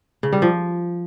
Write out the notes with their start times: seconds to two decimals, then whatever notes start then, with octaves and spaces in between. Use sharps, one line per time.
0.23 C#3
0.33 G3
0.42 F3